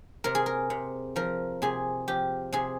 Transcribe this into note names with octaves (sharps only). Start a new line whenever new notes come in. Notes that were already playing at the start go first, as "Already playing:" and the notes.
C3 A#4
G#4
A#4
C3
F3 A#4
C3 G#4
F3 G4
C3 G#4